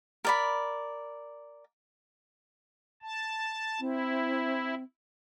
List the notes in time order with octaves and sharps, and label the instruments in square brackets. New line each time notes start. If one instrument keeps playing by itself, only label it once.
[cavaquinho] A#4 D5 B5
[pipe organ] A5
[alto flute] C4 [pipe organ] E4